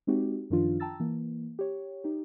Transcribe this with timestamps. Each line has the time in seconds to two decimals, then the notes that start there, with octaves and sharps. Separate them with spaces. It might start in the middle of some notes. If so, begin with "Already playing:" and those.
0.07 G#3 C4 D#4 F#4 G4
0.50 F#2 D#3 F3 D4 F4
0.80 G5 A5 A#5 E6 A6
1.00 E3 A#3
1.59 G4 C#5
2.04 D#4 G4